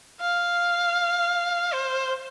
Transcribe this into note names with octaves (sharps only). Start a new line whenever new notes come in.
F5
C5